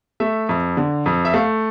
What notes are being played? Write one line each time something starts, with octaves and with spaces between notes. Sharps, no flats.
A3 E5
F2
D3
F2
E5
A3 F5